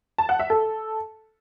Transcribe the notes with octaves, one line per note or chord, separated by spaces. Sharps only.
A5
F#5
E5
A4